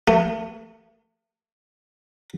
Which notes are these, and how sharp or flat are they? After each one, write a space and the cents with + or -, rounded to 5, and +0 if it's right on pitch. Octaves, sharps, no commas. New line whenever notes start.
A3 +35